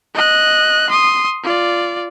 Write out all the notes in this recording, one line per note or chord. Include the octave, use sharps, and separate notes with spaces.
D#5 F#6
C6 D#6
F4 D5